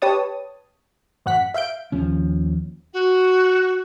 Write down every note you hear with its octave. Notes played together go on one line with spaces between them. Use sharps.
G4 B4 C#5 A5 D#6
A1 F#2 F#5 F#6 B6
E5 F5 G6 D7
D#2 F3 C#4
F#4